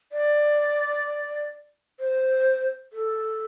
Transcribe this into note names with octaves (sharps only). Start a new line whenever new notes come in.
D5
C5
A4